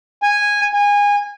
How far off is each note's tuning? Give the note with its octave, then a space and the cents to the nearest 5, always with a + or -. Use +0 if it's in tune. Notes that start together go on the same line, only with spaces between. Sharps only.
G#5 -10
G#5 -25